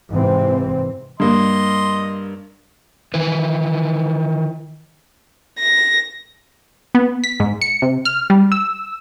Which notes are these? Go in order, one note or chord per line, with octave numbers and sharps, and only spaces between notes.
G#2 C3 E3 C4
G2 A#3 D#5 C6
D#3 E3 B4
A#6
B3
B6
G#2
C#7
C3
F6
G3
E6